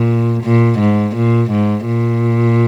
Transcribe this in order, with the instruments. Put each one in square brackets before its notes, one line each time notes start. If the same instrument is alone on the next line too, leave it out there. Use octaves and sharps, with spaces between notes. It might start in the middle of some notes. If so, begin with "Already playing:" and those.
Already playing: [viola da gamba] A#2
A#2
G#2
A#2
G#2
A#2